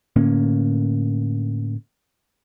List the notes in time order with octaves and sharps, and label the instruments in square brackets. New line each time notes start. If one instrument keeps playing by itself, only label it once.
[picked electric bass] A2 D3 A#3 C#4